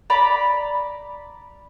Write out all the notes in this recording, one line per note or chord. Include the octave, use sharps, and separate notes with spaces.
D5 A#5 B5